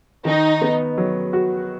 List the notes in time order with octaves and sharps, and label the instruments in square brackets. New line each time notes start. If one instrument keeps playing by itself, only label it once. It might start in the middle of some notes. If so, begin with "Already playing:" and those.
[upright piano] D#3 [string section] D#4
[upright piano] B3
F#3
F#4